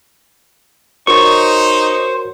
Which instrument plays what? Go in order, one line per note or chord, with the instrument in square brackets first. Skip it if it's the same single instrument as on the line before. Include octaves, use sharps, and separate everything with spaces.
[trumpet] D#4 [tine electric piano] F#4 A#4 C#5 [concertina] C5 [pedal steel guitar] C#6